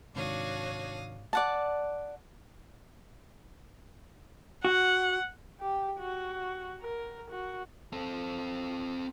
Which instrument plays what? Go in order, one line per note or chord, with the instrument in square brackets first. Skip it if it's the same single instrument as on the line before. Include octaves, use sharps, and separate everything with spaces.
[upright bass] G#2 [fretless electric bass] C3 D#3 [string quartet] D4 F#4 C#5 [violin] F5 D#6
[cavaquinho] D5 F#5 A5
[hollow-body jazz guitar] F#4 [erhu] F#5
[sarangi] G4
F#4
A#4
F#4
[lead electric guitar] C4 A4